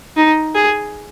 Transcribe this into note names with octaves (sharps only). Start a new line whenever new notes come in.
D#4
G#4